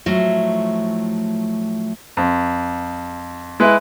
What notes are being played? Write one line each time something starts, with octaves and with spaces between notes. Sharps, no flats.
A2 F3 F#3 A3
F2
G#3 E4 B4